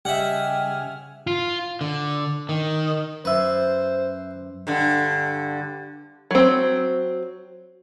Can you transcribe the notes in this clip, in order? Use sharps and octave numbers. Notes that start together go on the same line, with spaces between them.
C#3 G3 G4 D#5 E5 F#5 G#5 F6
F4
D3
D#3
F#2 B4 C5 E5
G2 D3
F#3 C4